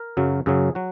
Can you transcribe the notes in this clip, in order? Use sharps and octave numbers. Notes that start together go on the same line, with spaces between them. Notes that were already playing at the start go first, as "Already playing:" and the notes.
Already playing: A#4
F#2 C#3 F#3
F#2 C#3 F#3 G#4
F#3 F#4